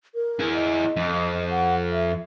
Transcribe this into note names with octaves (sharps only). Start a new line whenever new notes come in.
A#4
E4 G#4
D#5
F2
F#5
E5